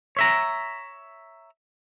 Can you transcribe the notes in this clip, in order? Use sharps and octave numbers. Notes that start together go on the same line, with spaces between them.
C#5 E5 A#5